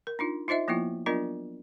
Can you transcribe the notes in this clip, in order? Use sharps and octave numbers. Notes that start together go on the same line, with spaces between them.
A#4
D4 D#4 F4
D#4 F4 C5 D#5 E5
F3 A#3 B3 E4 F4
F#3 B3 D4 F4 A#4 D#5